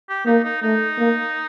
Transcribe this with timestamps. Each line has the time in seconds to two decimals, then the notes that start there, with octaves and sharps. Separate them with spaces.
0.09 G4
0.26 A#3 D#4
0.44 D#4
0.62 A3 D#4
0.98 A#3